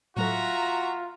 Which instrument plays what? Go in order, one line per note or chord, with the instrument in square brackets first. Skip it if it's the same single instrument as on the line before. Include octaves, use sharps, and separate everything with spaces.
[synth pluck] A2 F#3 A4 [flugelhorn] F4 [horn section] F#4 [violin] E5 A#5